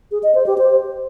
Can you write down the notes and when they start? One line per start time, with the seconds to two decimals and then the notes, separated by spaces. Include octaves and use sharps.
0.11 G#4
0.23 D#5
0.35 C5
0.46 G4
0.58 C5